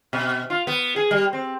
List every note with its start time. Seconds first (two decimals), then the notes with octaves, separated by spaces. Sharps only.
0.13 B2
0.50 F4
0.67 B3
0.96 G#4
1.11 G3
1.33 C4